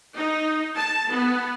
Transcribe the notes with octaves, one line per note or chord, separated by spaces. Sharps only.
D#4
A5
B3